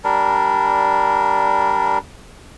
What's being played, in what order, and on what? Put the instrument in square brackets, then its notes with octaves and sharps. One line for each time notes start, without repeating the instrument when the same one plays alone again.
[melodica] G3 D4 A#4